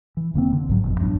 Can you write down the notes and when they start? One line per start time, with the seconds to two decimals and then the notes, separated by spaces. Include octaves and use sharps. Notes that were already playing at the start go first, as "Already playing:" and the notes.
0.17 E3
0.34 F1 D3 A#3 C4
0.53 D3
0.67 B1 G#2 F#3
0.83 G1 F2 B2
0.99 A1 F#2 F#3 D4